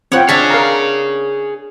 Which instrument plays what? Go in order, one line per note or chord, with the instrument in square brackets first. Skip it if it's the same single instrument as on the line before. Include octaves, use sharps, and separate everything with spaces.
[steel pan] C4 F4 G5 [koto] C#5 F#5
[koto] D4 E5 A5 [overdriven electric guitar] G#4 C#5
[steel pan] A#4 F5 A#5